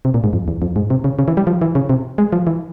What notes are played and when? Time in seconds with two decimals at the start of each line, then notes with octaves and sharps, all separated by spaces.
0.05 C3
0.14 A#2
0.24 G#2
0.33 F2
0.48 E2
0.62 F2
0.76 G#2
0.90 C3
1.04 C#3
1.19 C#3
1.28 E3
1.37 G3
1.47 F3
1.62 E3
1.75 C#3
1.89 C3
2.18 G#3
2.33 F3
2.47 E3